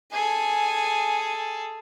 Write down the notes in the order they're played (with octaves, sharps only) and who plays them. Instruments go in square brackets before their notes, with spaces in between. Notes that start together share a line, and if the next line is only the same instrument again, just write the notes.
[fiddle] G#4 A4 [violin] G#5